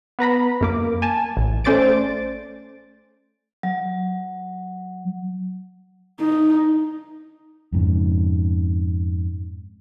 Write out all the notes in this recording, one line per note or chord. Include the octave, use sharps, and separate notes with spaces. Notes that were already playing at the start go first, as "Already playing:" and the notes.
B3 B4 A#5 B5
F#2 A#3 D6
G#5 A5
A1
A3 C#4 C5 D5 A6 D7
F#3
D#4
F2 G#2 C#3